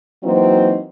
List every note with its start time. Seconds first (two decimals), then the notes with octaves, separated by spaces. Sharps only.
0.23 E3 F#3 A#3 C4 D#4 F#4